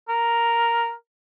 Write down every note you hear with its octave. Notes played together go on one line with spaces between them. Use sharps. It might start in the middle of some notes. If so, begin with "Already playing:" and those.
A#4